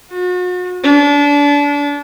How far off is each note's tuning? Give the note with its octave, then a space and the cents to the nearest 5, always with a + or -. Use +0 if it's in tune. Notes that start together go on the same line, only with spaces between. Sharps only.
F#4 -40
D4 -30